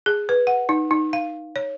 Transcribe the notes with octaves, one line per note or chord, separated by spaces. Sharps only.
G#4
B4
F#5
D#4
D#4
F5
C#5